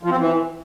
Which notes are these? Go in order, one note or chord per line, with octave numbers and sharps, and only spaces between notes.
F3
C4
E3